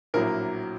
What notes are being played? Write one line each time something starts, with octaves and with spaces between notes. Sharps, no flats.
A#1 A2 F#3 A#3 A#4